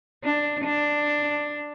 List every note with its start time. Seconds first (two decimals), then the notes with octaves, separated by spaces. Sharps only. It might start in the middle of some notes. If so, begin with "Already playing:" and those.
0.24 D4
0.65 D4